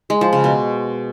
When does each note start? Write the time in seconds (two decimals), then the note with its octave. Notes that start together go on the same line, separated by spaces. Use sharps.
0.10 G#3
0.21 F3
0.33 C#3
0.44 B2